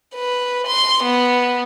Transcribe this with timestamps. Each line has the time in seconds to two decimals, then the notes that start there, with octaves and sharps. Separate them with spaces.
0.15 B4
0.67 C6
1.03 B3